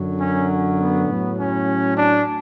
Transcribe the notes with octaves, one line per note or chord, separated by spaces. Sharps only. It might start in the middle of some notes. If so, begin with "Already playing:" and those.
Already playing: F#2 D3 F#3
C#4
B3
A2 F#3
C#4
D4